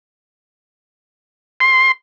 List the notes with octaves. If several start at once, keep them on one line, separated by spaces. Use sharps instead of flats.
C6